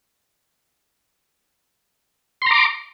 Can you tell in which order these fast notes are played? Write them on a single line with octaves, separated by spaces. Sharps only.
C6 A#5 D6